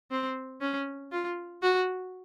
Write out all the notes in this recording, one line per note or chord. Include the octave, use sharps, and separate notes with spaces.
C4
C#4
F4
F#4